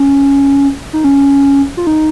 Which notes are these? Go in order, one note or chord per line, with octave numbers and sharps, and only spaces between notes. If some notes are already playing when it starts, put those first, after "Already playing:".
Already playing: C#4
D#4
C#4
F4
D#4